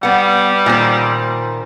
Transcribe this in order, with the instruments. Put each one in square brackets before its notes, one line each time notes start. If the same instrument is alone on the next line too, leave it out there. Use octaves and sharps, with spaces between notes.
[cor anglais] G3 [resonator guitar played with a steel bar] B3 F#5
[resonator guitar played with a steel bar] A#2 D#3 C5